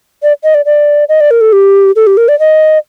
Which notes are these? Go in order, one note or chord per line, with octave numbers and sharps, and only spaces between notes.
D5
D#5
D5
D5
D#5
D5
A#4
A4
G4
A4
G4
A#4
D5
D#5